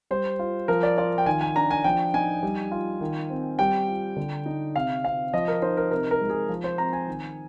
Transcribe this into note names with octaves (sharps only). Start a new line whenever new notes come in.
G3 C5
F4
F3 A#4
D5
F4 D5
G5
D#3 G#5
G#5
D4 A#5
G#5
F3 G5
D#4 G#5
G3
F4
D#3
C4
G3 G5
F4
D3
D#4
C3 F5
C4 F5
F3 D#5
A#4
D#4 C5
A#4
C3 A#4
A#4
G#3
G#4
F3
C5
C4 A#5
G#5
D#3